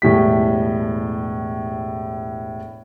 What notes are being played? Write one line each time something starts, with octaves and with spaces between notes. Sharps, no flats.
E1 A2 G3 B6